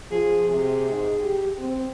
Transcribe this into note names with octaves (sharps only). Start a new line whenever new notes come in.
F3 G#4
C3 G#4
G#2
G4
C4